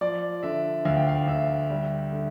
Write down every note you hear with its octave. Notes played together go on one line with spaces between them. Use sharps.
F3 D5
D3 E5
D2 F5
G5
F5
D2 E5
G3
D3